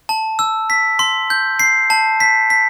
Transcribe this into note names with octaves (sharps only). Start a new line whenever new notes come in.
A5
E6
B6
C6
G6
C7
A5
B6
B6